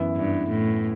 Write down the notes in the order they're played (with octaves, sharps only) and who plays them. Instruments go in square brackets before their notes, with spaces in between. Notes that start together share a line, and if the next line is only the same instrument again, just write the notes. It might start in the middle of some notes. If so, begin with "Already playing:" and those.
Already playing: [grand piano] F#2 E3 B3 E4
[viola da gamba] G2
A2